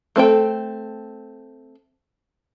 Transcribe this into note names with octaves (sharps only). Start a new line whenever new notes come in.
A3 C4 A4 G5